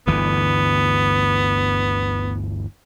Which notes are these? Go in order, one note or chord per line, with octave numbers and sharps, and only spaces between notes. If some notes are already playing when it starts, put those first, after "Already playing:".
G1 D2 E3 B3